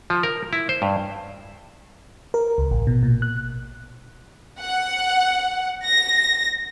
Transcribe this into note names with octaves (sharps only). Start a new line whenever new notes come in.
F3
A#4
E4
C5
G2
A#4
C#2
A1
B2
A#2
F#6
F#5
A#6